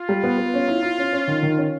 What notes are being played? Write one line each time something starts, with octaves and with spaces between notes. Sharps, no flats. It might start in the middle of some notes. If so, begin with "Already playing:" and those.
Already playing: F4
G3
B3
B3
C#4
E4
E4
C#4
C#4
D#3
D#3
C#4